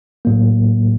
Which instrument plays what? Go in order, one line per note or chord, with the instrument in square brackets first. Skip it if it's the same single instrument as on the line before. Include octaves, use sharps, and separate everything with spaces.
[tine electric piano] A2 F#3 A#3